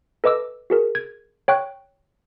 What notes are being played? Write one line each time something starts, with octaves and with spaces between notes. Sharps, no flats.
A4 B4 D#5 D6 E6
F#4 G#4 A#4
G#6
C#5 G5 C#6 F#6